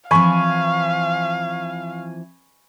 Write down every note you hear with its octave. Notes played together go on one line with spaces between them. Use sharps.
E3 F3 C4 F5 G#5 B5 C#6